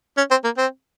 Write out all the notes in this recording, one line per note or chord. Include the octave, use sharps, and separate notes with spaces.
C#4
C4
A#3
C4